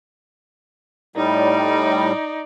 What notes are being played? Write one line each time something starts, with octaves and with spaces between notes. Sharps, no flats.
A2 G3 D#4 D5